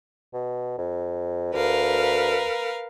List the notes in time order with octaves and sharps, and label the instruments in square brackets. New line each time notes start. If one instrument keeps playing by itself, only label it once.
[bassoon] B2
F2
[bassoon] D2 [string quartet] A#4 B4 F5